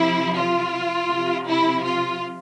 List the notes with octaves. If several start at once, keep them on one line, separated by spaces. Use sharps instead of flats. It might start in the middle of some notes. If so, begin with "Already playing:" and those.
Already playing: C3 F3 E4
F4
C3 F3
E4
F4